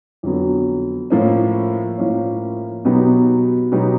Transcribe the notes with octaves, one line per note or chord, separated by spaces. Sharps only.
F2 D3 F#3 B3
A2 F3 A#3 C#4
A2 F3 A#3 C#4
B2 F#3 B3 D#4 G4
B2 F#3 B3 D#4 G4